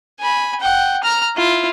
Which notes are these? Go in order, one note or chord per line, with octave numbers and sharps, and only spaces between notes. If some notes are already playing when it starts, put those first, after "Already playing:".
G#5 B5
F#5 G5
A#5 F6
E4 F4